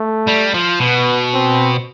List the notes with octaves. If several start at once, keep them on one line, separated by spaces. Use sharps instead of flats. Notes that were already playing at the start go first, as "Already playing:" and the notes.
Already playing: A3
G3
F3
B2 B3
C4